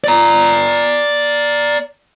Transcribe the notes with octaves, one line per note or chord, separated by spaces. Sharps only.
D5 A#5